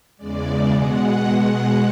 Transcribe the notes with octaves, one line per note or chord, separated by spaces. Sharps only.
E2 C#3 G#3 D5
B2 G#3 F#5